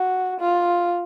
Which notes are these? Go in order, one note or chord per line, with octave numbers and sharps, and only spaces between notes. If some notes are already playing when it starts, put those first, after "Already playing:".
Already playing: F#4
F4